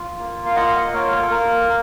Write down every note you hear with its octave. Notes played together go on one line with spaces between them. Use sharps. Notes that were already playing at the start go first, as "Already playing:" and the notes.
Already playing: F4
A#3
F5
F4 D#5 F#5
D#5 F#5
A#3 A#4 C#5
A#4
A4
A#3 A#4